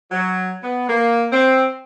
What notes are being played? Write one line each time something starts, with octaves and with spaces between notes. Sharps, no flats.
F#3
B3
A#3
C4